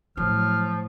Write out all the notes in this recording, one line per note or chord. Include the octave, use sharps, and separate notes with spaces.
A2 F3 F#3 F6